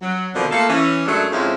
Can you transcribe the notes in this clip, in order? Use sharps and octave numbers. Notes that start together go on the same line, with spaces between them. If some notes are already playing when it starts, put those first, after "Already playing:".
F#3
F2 B2 D3 D#3 F3
A3 A#3 F4 A4
E3 C#4
F#2 F#3 G#3 A3 D4
F2 G#2 C#4 E4 F4 F5